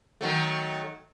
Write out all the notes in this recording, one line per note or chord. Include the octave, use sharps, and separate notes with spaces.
D#3 F#3 A3